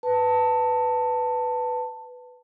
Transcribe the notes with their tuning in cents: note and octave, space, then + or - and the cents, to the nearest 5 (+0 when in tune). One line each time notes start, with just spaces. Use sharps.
B4 +5 A5 +15